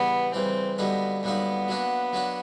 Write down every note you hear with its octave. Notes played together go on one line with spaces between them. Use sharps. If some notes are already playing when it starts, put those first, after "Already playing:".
Already playing: C#3 E3 G3 B3
C#3 E3 G3 C4
F#2 D3 G3 A#3 B3 D#4
F#2 D3 G3 A#3 B3 D#4
F#3 A#3 D4 F#4
F#3 A#3 D4 F#4